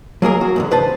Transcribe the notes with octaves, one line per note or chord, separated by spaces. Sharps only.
F#3 A#3 G#4 A#4
F#4
E2 G#2 D3
C#2 B4 C5 A5